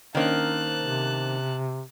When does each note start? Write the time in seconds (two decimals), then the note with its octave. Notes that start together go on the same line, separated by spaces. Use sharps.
0.15 D#3 A#3 C#4 D4 C5 A5 F#6
0.81 C3